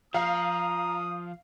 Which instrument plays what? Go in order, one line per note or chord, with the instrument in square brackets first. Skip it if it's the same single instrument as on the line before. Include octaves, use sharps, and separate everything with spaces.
[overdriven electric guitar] F3 [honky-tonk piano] F5 C7 [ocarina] A#5 [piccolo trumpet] D#6